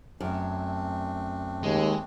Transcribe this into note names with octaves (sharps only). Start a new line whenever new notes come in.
F#2 A3 C4 D4
D#2 G#3